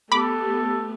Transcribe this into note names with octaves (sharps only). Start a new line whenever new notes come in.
A3 B3 G4 A4 B5 D6